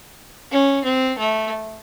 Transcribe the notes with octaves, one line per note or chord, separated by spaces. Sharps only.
C#4
C4
A3